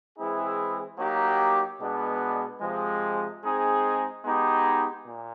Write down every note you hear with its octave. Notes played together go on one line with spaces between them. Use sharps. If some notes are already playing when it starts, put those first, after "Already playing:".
E3 G#3 C4 E4 G#4
F#3 A#3 D#4 G4
B2 G#3 B3 D4
C3 F3 G#3
G#3 C4 D#4 G#4
G#3 B3 D#4 G4
A#2